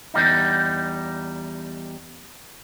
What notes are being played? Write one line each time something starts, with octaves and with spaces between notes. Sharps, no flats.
E2 G3 D#4